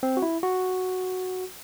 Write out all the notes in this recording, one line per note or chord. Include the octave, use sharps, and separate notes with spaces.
C4
F#4
E4
F#4